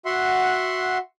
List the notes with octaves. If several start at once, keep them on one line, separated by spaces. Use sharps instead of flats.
F#4 E5 F#5 C6